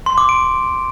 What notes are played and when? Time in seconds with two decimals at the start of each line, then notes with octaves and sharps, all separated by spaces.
0.06 C6
0.18 D6
0.29 D7